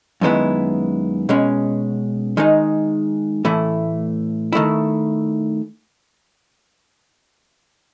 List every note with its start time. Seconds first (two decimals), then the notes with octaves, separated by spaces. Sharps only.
0.21 F#2 D#3 G#3 B3 E4
1.29 B2 G#3 C#4
2.37 D#3 G#3 D#4
3.45 A2 E3 A3 E4
4.53 D#3 A3 E4